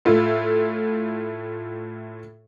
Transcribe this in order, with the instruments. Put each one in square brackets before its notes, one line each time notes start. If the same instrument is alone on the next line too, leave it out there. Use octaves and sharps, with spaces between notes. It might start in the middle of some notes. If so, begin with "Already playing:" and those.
[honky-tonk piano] A2 A3 E4 F4